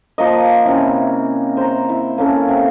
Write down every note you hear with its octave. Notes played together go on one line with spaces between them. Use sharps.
F3 A#3 D#5
C3 C#4 E4
C5 A#5
E4
A#3 C#4 A4
C3